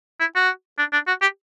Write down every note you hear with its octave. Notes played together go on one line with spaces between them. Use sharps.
E4
F#4
D4
D4
F#4
G4